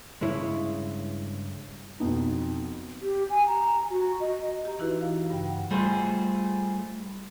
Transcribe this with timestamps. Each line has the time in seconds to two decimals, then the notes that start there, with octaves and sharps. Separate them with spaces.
0.21 G2 C#3 G#3 E4 C#5
2.00 F2 B2 B3 D#4
3.02 G4
3.30 G#5
3.46 A#5
3.90 F#4
4.20 D#5
4.65 G4 D#5 A#5
4.79 E3 D#4 E4 F#4 B4
5.01 F5
5.30 G2 C#3 G5
5.46 F#5 G5
5.71 G3 A3 F4 G#4 C5